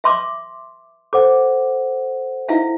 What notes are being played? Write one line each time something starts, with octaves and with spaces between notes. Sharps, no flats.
E5 C6 D6
A4 C5 F#5 D6
E4 E5 F5